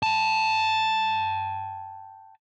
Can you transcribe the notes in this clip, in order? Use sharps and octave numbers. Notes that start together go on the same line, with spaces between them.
G5 A5